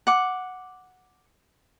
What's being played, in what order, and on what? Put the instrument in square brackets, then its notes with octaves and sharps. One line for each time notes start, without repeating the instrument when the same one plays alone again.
[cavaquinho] F#5 D6